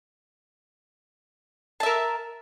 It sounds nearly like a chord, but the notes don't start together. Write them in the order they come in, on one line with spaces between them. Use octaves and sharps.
A5 E5 A#4